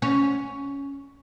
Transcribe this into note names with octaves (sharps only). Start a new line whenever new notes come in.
C#4